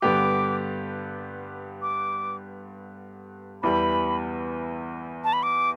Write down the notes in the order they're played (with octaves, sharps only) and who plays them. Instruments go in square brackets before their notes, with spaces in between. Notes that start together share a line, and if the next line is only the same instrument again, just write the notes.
[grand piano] G2 D3 B3 G4 [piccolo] D6
[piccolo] D6
[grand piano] E2 E3 G3 [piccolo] B5
[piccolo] A5
B5
D6